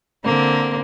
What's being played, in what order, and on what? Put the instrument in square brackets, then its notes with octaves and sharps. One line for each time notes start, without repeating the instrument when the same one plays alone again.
[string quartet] D3 A#3 C4